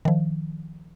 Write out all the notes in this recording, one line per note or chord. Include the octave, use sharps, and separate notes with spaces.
D#3 F3